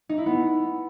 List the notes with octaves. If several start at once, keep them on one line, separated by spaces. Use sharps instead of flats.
D#4
E4
B3